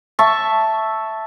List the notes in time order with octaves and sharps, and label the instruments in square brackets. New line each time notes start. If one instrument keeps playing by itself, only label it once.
[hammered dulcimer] E5 A5 C#6